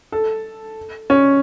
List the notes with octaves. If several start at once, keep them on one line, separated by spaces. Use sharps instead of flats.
A4
C#4